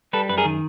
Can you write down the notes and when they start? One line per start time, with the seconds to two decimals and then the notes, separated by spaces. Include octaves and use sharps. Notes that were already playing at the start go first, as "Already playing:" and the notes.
0.13 G3 A4 B4
0.29 F#2 B4
0.38 G#4 A#4
0.45 D#3